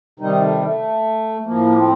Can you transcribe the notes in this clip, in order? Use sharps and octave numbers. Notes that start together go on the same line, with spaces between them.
C3 D#3 G3 D#4
A3
A3
F3 A#3
A2
C4